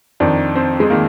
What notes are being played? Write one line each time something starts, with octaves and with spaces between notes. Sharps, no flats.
F2 D#3 D4
C4
G#3
D#3 A#3